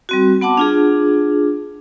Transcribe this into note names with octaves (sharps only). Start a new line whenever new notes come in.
G3 C4 F#4
B3 F#5 A5 D6
D4 F4 G#4